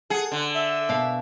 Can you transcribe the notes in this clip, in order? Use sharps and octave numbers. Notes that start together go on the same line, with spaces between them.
G#4 A4 F#5 A5
D3
E5
B2 A#4 F5